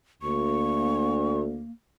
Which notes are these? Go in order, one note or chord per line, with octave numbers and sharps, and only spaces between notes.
D2 A#3 C#6